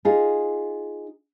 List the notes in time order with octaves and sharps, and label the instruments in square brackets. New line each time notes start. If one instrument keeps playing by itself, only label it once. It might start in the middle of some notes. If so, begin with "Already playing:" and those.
[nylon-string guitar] D#4 F4 G#4